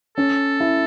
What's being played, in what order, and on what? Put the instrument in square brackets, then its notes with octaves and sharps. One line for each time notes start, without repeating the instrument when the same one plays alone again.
[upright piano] C#4 [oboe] A4
[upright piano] E4